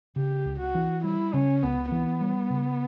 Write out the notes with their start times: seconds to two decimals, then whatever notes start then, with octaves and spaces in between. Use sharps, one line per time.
0.16 C#3 G4
0.45 C#2
0.60 F#4
0.75 E3
1.04 G3 E4
1.34 C#3 C#4
1.63 C#2 B3
1.92 E3 B3
2.21 G3
2.50 C#3